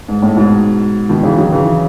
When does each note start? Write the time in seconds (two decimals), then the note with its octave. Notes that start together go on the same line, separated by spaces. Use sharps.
0.08 G#2
0.22 A2
0.36 G#2 B2
1.09 B2 D#3
1.23 C#3 E3
1.38 D#3 F#3
1.52 C#3 E3